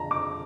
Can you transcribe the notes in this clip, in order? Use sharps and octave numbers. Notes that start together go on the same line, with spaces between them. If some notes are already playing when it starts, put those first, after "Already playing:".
Already playing: F2 D3 F3 A5 A#5
D6